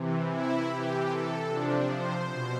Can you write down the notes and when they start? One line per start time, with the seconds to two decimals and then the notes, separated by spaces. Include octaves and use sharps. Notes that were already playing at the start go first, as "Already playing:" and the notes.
Already playing: C3 E3
0.30 E4
0.70 C3 E3 G4
1.10 A4
1.49 C3 F3 D4
1.89 C5
2.30 B2